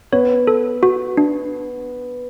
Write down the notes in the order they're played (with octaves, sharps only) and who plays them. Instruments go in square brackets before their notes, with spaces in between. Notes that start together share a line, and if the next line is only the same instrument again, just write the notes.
[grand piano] B3 [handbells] C#5
[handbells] A4
F#4
D4